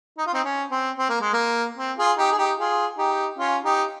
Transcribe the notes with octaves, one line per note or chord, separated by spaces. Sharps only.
D#4
F4
C4 D#4
C#4
C4
C4
A#3
G#3
A#3
C4
F4 G#4
D#4 G4
G#4
D#4 G4
F4 G#4
D#4 G4
C#4 F4
D#4 G4